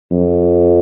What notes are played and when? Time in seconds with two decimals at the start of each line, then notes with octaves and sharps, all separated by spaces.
0.11 F2